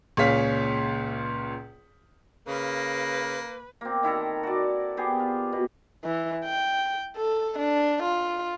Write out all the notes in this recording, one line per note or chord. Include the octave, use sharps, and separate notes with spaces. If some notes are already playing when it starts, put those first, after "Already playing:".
C#2 A#2 G#4 C#5 F5 B6
C#3 A#3 B4
A#3 C4
D#3 E4 A4 A#5
F#4 D5
B3 G4 G#4
F4
B2
E3
G5
A4
D4
F4